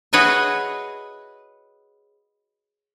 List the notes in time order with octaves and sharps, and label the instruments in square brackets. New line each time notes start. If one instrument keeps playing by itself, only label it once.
[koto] F#4 G#4 B4 C#5 D#5 E5